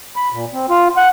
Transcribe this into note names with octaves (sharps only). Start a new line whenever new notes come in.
B5
A#2
C4
F4
F#5